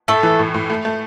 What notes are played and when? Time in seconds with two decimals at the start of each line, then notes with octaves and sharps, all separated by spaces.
0.08 A2 A3 A4
0.23 E3
0.39 A2
0.54 A2
0.70 A3
0.85 A3